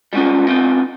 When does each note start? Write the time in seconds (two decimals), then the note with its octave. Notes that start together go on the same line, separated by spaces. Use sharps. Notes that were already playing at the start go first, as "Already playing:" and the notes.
0.13 G3 G#3 B3 C#4 F4
0.47 B3 C4 D#4 F4